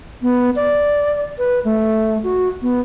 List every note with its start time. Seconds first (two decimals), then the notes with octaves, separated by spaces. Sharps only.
0.23 B3
0.56 D5
1.38 B4
1.65 A3
2.23 F#4
2.62 B3